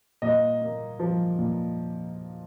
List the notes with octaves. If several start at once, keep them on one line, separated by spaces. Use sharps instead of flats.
A#2 D#5
A#3
F3
A#2